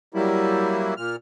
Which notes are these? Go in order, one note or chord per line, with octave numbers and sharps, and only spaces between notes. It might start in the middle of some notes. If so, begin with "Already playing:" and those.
F#3 G3 A#3 E4
A#2 F6